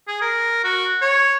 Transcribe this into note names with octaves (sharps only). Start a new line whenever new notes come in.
G#4
A#4
F#4
C#5